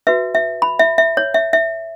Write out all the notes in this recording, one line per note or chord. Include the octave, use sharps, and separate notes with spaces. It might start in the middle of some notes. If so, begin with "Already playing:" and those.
F#4 B4 E5
E5
B5
E5
E5
C#5
E5
E5